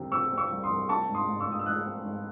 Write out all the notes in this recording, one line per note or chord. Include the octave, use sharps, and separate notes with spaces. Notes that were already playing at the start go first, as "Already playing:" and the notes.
Already playing: C2 C3 C4
C4 C#6 E6
C4
C#6 E6
C2
C6 D#6
C2
C4 A5 C#6
G#2
C6 D#6
G#2
C#6 E6
G#2
D#6
E6
G#2 D#6 F#6
C4
G#2